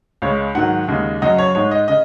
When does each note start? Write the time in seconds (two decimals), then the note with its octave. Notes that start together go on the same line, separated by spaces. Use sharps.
0.22 C#2 C#3 G#3 C#5
0.55 G#2 D#3 F#3 F#5
0.88 D#2 C#3 G#3
1.22 F#2 C#3 F#3 D#5
1.38 C#5
1.55 G#2 G#3 C#5
1.71 D#5
1.88 C#3 D#5